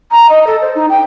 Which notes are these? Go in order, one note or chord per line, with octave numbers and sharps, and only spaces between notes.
A#5
D#5
A4
C5
D#4
G5